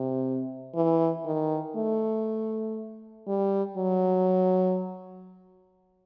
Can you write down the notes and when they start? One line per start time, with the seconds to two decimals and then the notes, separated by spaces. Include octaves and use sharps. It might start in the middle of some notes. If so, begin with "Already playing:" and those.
Already playing: C3
0.75 E3
1.25 D#3
1.76 A3
3.27 G3
3.77 F#3